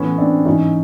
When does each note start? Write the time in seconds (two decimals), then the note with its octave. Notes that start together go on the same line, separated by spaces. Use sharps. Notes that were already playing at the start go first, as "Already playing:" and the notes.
Already playing: A2 E3 B3 C#4
0.18 C4 D4
0.46 G#2 E3 C#4 D#4